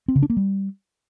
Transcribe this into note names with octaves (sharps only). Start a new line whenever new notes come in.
C4
C#3
D4
A#3
G3